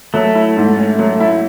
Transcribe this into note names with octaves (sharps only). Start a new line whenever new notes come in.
F#3 A3
E4
G#2
C#4
F#3
E4